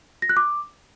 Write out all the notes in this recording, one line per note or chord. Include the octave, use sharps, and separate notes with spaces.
A#6
F#6
D6